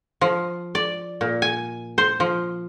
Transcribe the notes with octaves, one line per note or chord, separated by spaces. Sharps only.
F3
D5
A#2
G#5
C5
F3